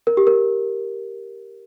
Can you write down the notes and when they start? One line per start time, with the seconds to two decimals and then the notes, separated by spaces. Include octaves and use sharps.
0.07 A#4
0.17 G4
0.27 A#4